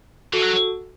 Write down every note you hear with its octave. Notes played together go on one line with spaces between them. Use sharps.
E3 F#4 A4
F#3